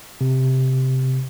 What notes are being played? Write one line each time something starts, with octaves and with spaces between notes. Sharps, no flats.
C3